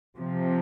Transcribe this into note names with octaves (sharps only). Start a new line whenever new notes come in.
C3 F3